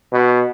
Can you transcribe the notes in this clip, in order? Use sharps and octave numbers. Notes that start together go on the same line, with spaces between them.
B2